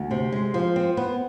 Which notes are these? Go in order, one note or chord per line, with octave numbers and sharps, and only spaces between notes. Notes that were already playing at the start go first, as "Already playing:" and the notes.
Already playing: D2
C3
G#3
F3
C4
B3